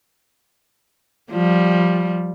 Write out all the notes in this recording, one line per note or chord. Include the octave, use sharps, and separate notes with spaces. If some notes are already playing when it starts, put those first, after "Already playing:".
F3 G3